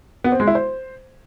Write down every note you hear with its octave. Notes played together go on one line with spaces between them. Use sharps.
B3
C4
G#3
E4
C5